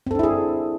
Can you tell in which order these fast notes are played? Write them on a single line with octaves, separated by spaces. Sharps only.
C4 A4 D4 E4 G#4